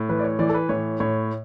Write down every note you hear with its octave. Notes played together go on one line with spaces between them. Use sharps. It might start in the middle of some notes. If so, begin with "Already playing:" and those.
Already playing: A2
E3 B4
D5
C#5
E3 D5
A4
B4
A2 C#5
A2 C#5